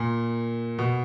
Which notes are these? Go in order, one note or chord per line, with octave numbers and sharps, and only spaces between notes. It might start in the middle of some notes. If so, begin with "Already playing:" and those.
Already playing: A#2
B2